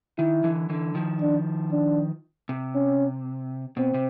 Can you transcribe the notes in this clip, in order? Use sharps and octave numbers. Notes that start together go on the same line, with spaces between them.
D#3 E4
D3 E3
D3 E3
D#3 F3
D4
D4
C3
C#4
B2 C4
C3